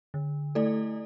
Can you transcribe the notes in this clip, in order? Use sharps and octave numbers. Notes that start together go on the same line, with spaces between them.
D3
A3 E4 A4 D5